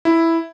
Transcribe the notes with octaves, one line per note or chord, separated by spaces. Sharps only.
E4